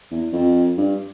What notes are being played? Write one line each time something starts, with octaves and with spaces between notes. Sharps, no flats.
E2
F2
G2